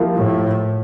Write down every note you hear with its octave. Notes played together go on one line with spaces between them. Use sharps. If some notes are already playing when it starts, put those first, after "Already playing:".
Already playing: F3 A#3 E4 G4
A2